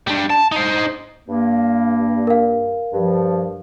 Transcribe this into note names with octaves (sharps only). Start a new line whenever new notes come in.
G3 D4
A5
D#4 C5
G2 A#3
A#4 F5
G2 F3